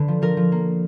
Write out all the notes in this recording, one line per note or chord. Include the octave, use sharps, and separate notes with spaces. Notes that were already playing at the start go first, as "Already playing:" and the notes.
Already playing: D3 B4
F3
F3 A#4
F3
A#3